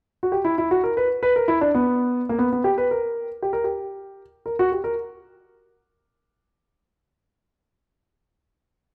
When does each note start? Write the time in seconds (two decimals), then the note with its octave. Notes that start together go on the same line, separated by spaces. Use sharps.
0.23 F#4
0.32 G4
0.45 E4
0.58 E4
0.71 F#4
0.84 A#4
0.97 B4
1.23 B4
1.36 A#4
1.48 E4
1.61 D4
1.75 B3
2.29 A#3
2.39 B3
2.53 B3
2.64 G4
2.78 B4
2.91 A#4
3.42 G4
3.53 A#4
3.64 G4
4.46 A#4
4.59 F#4
4.72 G4
4.84 A#4